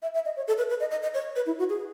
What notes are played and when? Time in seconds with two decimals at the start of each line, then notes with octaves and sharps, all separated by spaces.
0.02 E5
0.14 E5
0.25 D#5
0.36 C#5
0.48 A4
0.58 B4
0.69 B4
0.80 D#5
0.91 D#5
1.02 D#5
1.14 C#5
1.36 B4
1.46 E4
1.59 F#4
1.70 G#4